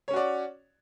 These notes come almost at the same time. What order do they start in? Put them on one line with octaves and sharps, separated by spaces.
C#5 C#4 F#4 D5